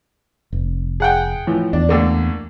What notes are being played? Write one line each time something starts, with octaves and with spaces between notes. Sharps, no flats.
F1
G#4 F#5 G5
A2 E3 F3
E2 D4
D2 D3 A#3